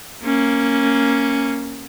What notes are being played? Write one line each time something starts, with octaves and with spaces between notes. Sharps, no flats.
A#3 C#4